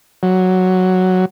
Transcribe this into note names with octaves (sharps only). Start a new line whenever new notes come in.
F#3